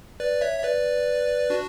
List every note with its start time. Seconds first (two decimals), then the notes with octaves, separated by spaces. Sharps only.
0.20 B4 D5
0.41 C#5 E5
0.60 E5
0.63 B4 D5
1.50 D4 F#4